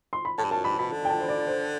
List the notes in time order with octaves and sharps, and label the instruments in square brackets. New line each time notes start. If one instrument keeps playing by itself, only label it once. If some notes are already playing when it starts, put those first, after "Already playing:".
[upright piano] C6
B5
[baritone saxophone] A2 [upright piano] A5
[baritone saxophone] G2
[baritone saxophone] F#2 [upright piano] A5
[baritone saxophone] G2 [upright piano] B5
[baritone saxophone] B2 [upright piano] B5
[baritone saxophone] D3
[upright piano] G5
A5
C5
D5
C5